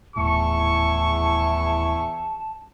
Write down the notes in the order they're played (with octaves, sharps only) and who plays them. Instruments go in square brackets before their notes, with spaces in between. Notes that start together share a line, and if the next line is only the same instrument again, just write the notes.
[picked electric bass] D#1 A2 [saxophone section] E2 E4 G#4 [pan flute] A5 [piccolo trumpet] C#6